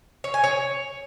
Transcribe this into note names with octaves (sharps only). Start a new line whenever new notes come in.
C#5
G#5
C#5